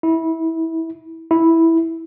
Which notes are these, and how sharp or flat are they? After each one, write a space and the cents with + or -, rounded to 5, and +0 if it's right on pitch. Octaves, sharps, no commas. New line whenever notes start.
E4 -20
E4 -5